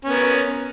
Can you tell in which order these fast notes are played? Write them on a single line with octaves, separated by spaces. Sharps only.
C#4 B3 A#4